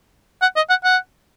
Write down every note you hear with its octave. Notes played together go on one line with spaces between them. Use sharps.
F#5
D#5
F#5
F#5